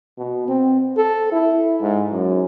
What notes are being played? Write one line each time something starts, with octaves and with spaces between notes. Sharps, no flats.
B2
C4
A4
E4
G#2
F#2